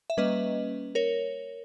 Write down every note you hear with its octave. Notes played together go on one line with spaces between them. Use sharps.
E5
G3 A#3 C#4 B4 D#5
A#4 C#5